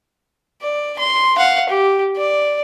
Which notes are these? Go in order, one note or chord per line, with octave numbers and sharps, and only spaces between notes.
D5
C6
F5 F#5
G4
D5